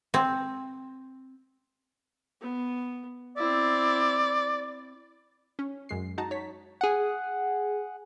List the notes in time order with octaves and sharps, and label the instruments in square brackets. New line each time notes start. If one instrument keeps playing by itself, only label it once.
[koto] C4
[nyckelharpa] B3
[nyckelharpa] C4 E4 [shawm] D5
[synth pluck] C#4
F#2 G#3 C7
D#4 F#4 A5 A#5
C#5 B6
[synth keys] G#4 F#5